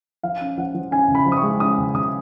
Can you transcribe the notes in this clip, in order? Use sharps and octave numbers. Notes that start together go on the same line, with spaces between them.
F3 F5
C#4
F3 F#5
F3
C#4 G#5
C#3
B5
F3
D#6
C#6
G#3
C#4 D#6
C#3
C#3 D#6